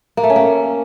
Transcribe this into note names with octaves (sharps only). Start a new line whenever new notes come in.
A#3
A3
C#4
A#3